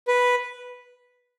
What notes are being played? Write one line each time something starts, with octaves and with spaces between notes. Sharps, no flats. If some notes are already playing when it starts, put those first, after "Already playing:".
B4